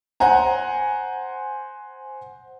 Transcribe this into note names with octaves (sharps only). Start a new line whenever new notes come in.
C5 F#5 G#5 A#5